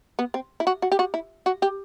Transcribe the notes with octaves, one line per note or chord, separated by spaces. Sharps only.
B3
C4
E4
F#4
F#4
G4
F#4
E4
F#4
G4